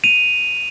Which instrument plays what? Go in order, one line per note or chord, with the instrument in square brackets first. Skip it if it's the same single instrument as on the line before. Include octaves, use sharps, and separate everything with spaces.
[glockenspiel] D#7 F7